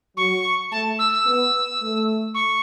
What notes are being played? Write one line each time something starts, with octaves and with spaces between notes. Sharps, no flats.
F#3 C#6
A3 A5
E6
E6
B3
A3
C#6